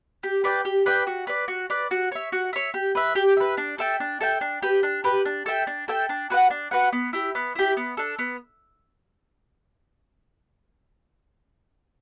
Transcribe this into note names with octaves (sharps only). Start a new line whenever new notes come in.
G4
B4 D5 G5
G4
B4 D5 G5
F#4
B4 D5
F#4
B4 D5
F#4
C#5 E5
F#4
C#5 E5
G4
B4 E5
G4
B4 E5
D4
A4 E5 G5
D4
A4 E5 G5
D4
G4 B4
D4
G4 B4
D4
A4 E5 G5
D4
A4 E5 G5
D4
F#4 B4 F#5
D4
F#4 B4 F#5
B3
E4 G4
B3
E4 G4
B3
D4 A4
B3